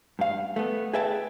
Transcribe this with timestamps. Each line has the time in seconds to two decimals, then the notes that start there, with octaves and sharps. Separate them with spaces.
0.19 G2 F5
0.56 A3 B3
0.93 G#4 B4 E5 G5 A5